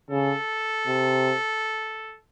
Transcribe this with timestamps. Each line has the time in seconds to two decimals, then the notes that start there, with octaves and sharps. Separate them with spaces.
0.10 C#3 A4
0.87 C3